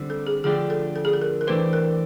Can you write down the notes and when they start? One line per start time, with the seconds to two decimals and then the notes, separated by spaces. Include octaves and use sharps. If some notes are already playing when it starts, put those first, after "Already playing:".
Already playing: D3 G3 C4
0.10 A4
0.27 G#4
0.44 D3 F3 A3 D4 G4 G#4
0.70 A4
0.96 A4
1.05 G#4
1.13 A4
1.22 A#4
1.41 A#4
1.47 E3 A3 D4 G4 B4 C5
1.73 A#4